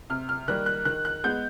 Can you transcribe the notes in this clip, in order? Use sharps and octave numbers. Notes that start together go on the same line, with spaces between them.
C3 F6
F6
D#3 G3 A#3 F#6
F#6
D#3 F#6
F#6
G#3 B3 G6